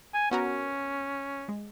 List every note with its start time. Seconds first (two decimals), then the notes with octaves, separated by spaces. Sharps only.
0.14 G#5
0.31 B3 C#4 F#4 A#4
1.49 G#3